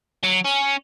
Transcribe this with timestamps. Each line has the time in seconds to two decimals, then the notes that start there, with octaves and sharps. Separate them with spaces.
0.23 F#3
0.44 C#4